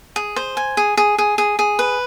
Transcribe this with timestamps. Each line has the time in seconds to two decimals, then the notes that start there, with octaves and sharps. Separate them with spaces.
0.16 G#4
0.36 C5
0.57 G#5
0.77 G#4
0.97 G#4
1.18 G#4
1.38 G#4
1.59 G#4
1.79 B4